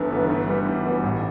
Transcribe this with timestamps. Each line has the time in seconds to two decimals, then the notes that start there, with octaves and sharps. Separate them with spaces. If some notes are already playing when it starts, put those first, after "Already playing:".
Already playing: G1 G2 E3 B3
0.10 G2 E3 B3
0.29 G2
0.48 E3 G3 B3
0.67 G2
0.86 E3 G3 B3
1.04 A1